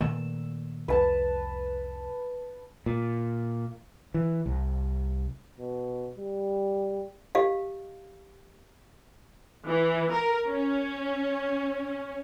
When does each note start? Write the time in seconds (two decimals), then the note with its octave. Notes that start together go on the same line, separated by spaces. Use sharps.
0.01 A#2 D#3 A3 E6
0.88 C2 F2 B4 A5
2.86 A#2
4.14 E3
4.46 C2
5.59 B2
6.18 G3
7.35 G4 D#5 F5
9.66 E3
10.10 A#4
10.48 C#4